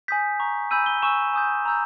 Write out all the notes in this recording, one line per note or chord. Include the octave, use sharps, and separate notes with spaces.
G#5 D#6 G6 B6
A#5 C#6 G6
G#5 B5 E6 G6 D#7
G7
G#5 C#6 E6 E7
G#5 D#6 G6
A#5 E6 G6